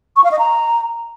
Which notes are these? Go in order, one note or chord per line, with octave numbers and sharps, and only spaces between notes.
C#6
F5
D#5
A#5